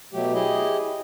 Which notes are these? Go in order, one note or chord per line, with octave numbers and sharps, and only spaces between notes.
B2 F#3 A3 G4
E4 G4 G#4 D#5